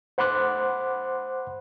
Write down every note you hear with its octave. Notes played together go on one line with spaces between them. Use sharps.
C5 F#5 B5 C6 D6 F#6